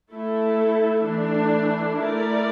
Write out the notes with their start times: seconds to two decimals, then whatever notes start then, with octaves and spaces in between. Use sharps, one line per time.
0.12 A3 E4 A4
1.05 E3 A3 D4
1.98 A3 E4 A#4 D5